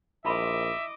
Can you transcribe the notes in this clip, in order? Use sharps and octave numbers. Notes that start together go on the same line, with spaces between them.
A#1 E4 D#5 E5 B5 C6 D6